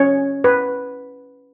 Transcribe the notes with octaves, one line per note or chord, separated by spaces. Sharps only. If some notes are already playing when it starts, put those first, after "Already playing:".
Already playing: C#4 C#5
B4